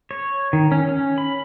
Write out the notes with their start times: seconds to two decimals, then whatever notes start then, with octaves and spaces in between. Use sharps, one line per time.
0.11 C#5
0.53 D#3
0.72 C#4
0.89 C#4
1.18 B5